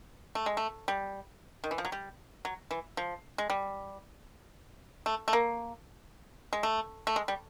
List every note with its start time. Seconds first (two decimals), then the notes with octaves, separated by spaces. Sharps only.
0.35 A3
0.46 G#3
0.57 A3
0.88 G3
1.64 D#3
1.71 E3
1.78 F3
1.85 F#3
1.92 G3
2.45 F#3
2.71 E3
2.97 F3
3.38 G#3
3.50 G3
5.06 A3
5.28 A3
5.33 A#3
6.53 G#3
6.63 A3
7.07 A3
7.16 G#3
7.28 G3